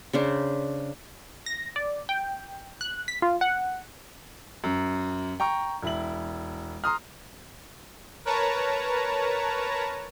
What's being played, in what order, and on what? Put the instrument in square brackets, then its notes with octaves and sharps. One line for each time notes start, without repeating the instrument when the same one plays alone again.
[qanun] C#3 D4 C5
[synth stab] A#6
D5
G5
F#6
B6
F4
F#5
[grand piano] F#2
G5 A#5 C#6
E1 E4 F#7
A#5 C6 D#6 F6
[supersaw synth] A#4 B4 C#5 A5 A#5